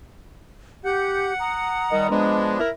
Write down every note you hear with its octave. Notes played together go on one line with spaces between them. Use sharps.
G4 F#5 G6
A#5 D#6
D#3 G3 D#5
F3 G#3 B3 D4
E4 A#4